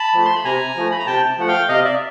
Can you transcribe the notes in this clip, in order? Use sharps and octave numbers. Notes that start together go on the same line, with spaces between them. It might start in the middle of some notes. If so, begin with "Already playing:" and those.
Already playing: A5 B5
F3 A3
C6
B5
C3 G#5 A#5
F3 A3
B5
A#5
C3 G5 A5
F3 A3 F#5
F5 G5
C3 D#5 F5
D5 E5